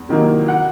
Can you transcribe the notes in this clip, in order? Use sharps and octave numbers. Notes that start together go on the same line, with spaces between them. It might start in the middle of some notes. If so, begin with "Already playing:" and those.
Already playing: E2
C3 D#3 F#3 A#3
F#5